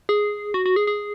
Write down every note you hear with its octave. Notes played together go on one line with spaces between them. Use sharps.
G#4
F#4
F#4
G#4
G#4